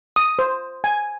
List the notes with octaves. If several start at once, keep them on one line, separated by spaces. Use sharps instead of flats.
D#6
C5
G#5